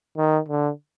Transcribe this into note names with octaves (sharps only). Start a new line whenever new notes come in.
D#3
D3